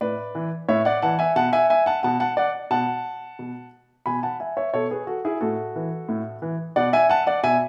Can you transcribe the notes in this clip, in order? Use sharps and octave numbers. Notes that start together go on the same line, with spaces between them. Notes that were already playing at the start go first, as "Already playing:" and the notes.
A2 B4 D5
E3
A2 C#5 E5
D5 F#5
E3 F#5 A5
E5 G#5
B2 F#5 A5
E5 G#5
E5 G#5
F#5 A5
B2 F#5 A5
F#5 A5
D5 F#5
B2 F#5 A5
B2
B2 G#5 B5
F#5 A5
E5 G#5
C#5 E5
B2 A4 C#5
G#4 B4
F#4 A4
E4 G#4
A2 F#4 A4
E3
A2
E3
B2 D5 F#5
E5 G#5
F#5 A5
D5 F#5
B2 E5 G#5